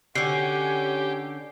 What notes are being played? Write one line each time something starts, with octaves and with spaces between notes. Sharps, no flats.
D3 C#4 F#4 G4 G#5 C7